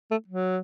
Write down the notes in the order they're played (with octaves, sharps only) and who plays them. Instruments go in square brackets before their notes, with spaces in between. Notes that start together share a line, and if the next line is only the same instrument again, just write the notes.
[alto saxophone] A3
F#3